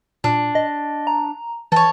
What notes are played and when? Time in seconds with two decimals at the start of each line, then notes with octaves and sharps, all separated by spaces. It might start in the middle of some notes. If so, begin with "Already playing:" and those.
0.24 A#2 D4
0.55 D#5
1.07 A#5
1.72 E3 A4 C#5